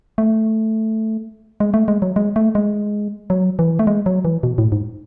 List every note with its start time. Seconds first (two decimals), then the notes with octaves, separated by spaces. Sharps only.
0.18 A3
1.60 G#3
1.74 A3
1.88 G#3
2.02 F#3
2.16 G#3
2.36 A3
2.55 G#3
3.30 F#3
3.59 E3
3.79 A3
3.87 G#3
4.06 F#3
4.25 E3
4.43 B2
4.58 A2
4.72 G#2